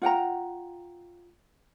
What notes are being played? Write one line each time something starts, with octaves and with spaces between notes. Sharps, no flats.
F4 F#5 G5 A#5